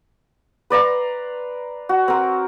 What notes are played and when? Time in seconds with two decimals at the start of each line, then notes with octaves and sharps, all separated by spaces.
0.70 B4 D5 A#5 C6
1.89 F#4
2.08 C4 A#4